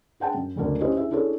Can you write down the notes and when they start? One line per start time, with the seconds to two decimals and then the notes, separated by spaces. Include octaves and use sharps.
0.20 G#4 F#5 G5 A5
0.35 F#2
0.56 F#1 D2 A3 A#3 D4
0.81 C#4 E4 G4 C5 D#5
0.97 E4 G#4 E5
1.11 D4 E4 G#4 A4 C#5